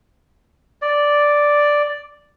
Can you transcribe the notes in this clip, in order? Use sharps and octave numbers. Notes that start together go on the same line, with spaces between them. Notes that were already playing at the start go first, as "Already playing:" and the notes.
D5